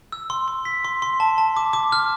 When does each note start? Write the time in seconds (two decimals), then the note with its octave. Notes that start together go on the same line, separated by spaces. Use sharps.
0.12 E6
0.30 C6
0.48 C6
0.65 B6
0.84 C6
1.02 C6
1.20 A5
1.38 A5
1.57 D6
1.73 D6
1.92 F6